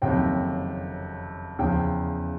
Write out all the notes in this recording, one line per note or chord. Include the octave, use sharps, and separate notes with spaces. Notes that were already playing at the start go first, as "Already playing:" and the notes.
F#1 F2 C3 D#3 F#3 G5
E2 C#3 F3 G5